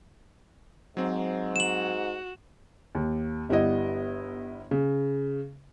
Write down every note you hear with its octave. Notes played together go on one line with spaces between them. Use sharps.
G#2 F#3 C4
F#4 E7 F#7
D#2
G1 G3 B3 E4 D#5
C#3